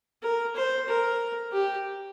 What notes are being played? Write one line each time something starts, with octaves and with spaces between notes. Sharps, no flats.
A#4
C5
A#4
G4